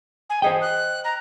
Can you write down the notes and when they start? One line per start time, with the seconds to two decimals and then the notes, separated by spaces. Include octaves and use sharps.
0.29 G#5
0.42 G#4 C5 D#5 G5
0.61 F#6
1.04 A#5